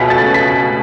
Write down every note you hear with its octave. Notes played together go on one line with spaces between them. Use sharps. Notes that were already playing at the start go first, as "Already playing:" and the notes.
Already playing: C#2 B2 A3 C#4 B6
A6
B6